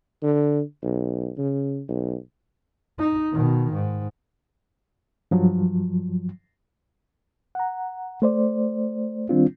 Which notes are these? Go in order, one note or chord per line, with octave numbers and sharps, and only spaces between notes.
D3
B1
C#3
B1
D#4
B2 D#3
G#2
G2 F3 F#3
F#5 A#5
A3 C5 D5
D#3 G3 C4 D4 F4